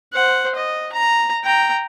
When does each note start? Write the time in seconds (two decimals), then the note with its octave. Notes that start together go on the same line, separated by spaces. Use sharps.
0.13 C5 F#5
0.55 D#5
0.92 A#5
1.44 G5 A#5